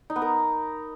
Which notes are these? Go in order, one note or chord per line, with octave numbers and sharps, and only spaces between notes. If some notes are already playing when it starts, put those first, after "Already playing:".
D#4
B3
A#4